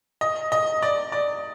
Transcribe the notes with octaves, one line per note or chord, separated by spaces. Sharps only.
D#5
D#5
D5
D5